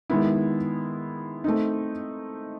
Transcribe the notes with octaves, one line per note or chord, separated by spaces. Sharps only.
D#3 G#3 B3 E4
A3 C4 D#4